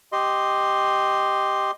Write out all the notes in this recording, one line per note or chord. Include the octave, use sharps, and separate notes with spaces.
G4 D#5 C6